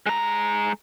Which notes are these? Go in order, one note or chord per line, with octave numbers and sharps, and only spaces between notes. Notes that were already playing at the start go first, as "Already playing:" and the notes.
G#3 A#5